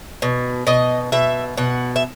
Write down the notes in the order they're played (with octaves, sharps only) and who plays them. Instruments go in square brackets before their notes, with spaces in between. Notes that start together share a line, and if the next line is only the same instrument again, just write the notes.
[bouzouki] B2
B2 D#5
B2 E5
B2 F#5
E5